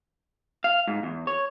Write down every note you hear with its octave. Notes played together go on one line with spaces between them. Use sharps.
F5
G#2
E2
C#5